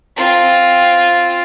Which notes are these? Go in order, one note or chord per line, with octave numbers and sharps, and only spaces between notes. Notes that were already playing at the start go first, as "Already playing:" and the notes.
C4 F4